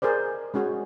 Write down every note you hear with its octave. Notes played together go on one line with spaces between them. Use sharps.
G#4 A#4 C5 D5
G#3 C#4 F#4 G#4